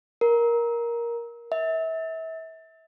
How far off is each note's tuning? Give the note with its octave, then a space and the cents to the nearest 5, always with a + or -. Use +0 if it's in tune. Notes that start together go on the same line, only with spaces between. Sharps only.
A#4 +10
E5 -30